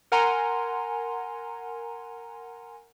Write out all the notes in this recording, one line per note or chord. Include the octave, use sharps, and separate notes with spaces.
A#4 F#5 G#5 A#5 C6